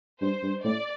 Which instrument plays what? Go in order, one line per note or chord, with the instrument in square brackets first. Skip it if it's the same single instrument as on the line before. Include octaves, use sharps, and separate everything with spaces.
[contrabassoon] G2 [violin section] C5
[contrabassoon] G2
[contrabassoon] A2 [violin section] D5